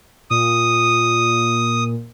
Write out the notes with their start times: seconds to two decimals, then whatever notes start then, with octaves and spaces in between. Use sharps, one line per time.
0.30 A#2 D#6